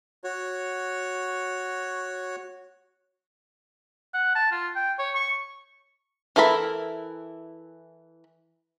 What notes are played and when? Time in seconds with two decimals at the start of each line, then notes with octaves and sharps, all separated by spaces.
0.24 F#4 C#5
4.14 F#5
4.35 A5
4.52 F4
4.76 G5
4.99 C#5
5.15 C#6
6.36 E3 E4 A4 A#4 B5